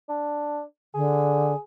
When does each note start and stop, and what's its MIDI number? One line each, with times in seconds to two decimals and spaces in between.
0.09 0.62 62
0.94 1.54 50
0.94 1.58 68